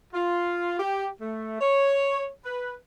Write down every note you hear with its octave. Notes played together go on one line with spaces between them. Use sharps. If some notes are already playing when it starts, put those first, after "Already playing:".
F4
G4
A3
C#5
B4